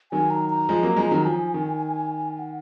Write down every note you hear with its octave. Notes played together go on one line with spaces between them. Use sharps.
D#3 F#3 G#5
A#5
A#5
F3 G#3
F#3 A#3
F3 G#3
D#3 F#3
F3 G#5
D#3
F#5